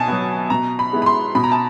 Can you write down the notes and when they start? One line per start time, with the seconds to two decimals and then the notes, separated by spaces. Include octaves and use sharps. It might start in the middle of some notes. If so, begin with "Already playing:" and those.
Already playing: B2 G#5 A5
0.08 F#3 B3
0.50 B2 A#5
0.79 B5
0.93 G#3 B3 E4
1.02 B5
1.06 C6
1.35 B2 B5
1.44 A#5
1.52 A5